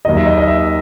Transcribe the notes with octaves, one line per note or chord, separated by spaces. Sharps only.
D#2 D#3 F#3 D#5
E5
D#5
D#5
E5